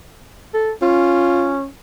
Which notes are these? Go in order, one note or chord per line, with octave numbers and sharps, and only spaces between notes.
A4
C#4 F4